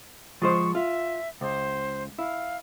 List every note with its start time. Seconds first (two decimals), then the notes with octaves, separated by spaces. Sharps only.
0.42 F3 G#3 C5 C#6
0.75 F4 E5
1.41 C#2 C5
2.18 E4 F5